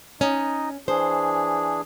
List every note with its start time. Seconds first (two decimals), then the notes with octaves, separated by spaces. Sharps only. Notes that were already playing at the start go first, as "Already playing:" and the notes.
0.21 C#4 D#4 D#5
0.88 E3 D4 G#4 C5